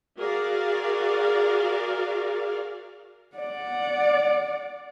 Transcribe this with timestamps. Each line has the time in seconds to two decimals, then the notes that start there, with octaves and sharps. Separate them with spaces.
0.19 F#4 G#4 A#4 D5 F5
3.36 D5 F#5